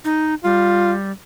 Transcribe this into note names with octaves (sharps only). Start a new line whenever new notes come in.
D#4
G3 F4